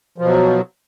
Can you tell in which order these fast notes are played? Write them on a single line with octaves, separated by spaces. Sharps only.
F3 B2 F#3